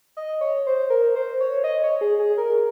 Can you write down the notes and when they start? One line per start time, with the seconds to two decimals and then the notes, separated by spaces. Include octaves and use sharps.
0.17 D#5
0.41 C#5
0.67 C5
0.90 A#4
1.15 C5
1.40 C#5
1.64 D#5
1.83 C#5
2.01 G#4
2.19 G#4
2.38 A#4